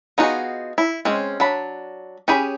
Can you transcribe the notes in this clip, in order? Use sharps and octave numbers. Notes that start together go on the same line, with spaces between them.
B3 D#4 F4 F#4 G#4
E4
G#3 C4 C#4
F#3 D4 B5
C#4 G4 G#4 B5